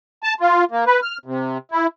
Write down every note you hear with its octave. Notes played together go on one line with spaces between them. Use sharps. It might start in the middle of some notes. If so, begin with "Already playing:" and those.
A5
F4
A#3
B4
F6
C3
E4